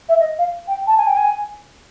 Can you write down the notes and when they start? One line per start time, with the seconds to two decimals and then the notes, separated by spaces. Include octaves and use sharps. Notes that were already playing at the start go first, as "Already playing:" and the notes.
0.08 E5
0.19 D#5
0.38 F5
0.67 G5
0.87 A5
0.97 G#5
1.06 G5
1.16 G#5